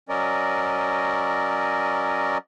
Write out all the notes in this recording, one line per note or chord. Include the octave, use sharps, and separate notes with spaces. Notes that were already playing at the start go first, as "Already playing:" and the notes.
F#3 C#4 A#4 D5 D#5